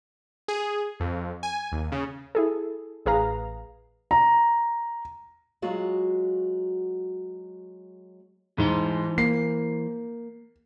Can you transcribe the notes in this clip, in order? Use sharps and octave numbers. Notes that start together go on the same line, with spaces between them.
G#4
F2
G#5
D#2
C#3
E4 G#4 A4
A1 G#4 B4 F5 A#5
A#5
F#3 G#3 F4 F#4 G#4
G#2 E3 C5
A#3 C7